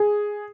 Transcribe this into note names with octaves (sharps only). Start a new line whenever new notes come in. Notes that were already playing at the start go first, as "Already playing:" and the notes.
Already playing: G#4